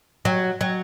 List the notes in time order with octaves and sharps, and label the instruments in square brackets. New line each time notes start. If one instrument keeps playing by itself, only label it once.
[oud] F#3
F#3